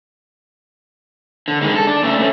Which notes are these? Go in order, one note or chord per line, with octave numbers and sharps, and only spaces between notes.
D3
D#3 G#3
A4
D4
C#3 A3
A3 C#4